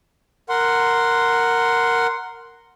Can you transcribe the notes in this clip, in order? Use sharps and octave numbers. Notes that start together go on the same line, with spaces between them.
A#4 F#5 C6